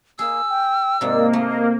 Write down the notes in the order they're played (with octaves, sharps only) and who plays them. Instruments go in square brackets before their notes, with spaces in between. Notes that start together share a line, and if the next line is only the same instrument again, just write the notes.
[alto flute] A#3 [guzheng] G#4 [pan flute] E6
[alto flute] G5
[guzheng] G#2 C3 [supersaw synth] A#3 [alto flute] D5
[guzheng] A3 [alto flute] D#5